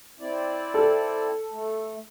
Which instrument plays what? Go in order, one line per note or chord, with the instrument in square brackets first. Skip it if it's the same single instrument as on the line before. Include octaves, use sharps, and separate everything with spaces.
[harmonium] C4 E4 D5
[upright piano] A4
[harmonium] A3